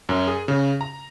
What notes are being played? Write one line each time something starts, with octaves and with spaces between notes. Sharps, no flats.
F#2
G#4
C#3
A#5